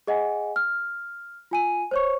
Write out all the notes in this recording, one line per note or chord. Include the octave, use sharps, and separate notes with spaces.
G#4 D#5 F#5 G#5
F6
F4 G#5 D#7
C5 C#5 C#6